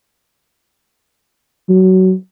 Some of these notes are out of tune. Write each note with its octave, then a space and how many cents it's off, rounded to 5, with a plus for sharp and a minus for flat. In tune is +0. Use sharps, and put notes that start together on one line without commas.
F#3 +20